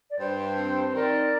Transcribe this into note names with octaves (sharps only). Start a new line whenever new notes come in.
D5
G2 C5
C4
C5
D#3 A#4 D5